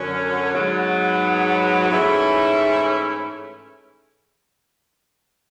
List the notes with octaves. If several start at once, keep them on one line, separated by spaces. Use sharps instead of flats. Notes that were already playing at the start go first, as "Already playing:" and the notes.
Already playing: F#2 D3 F#3 C#4
G#2 F#3 B3
G#2 E3 A3 C#4 E4